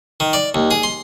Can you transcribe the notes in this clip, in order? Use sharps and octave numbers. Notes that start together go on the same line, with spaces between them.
D#3
D5
D#2
G#4
C6